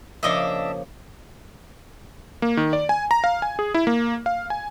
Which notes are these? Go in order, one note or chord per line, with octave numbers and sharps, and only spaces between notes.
C#3 F3 A#3 D4 D#5 E5
A#3
D#3
D5
G#5
A#5
F5
G#5
G#4
E4
A#3
F5
G#5